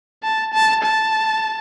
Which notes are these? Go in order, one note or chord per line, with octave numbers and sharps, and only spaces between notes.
A5
A5
A5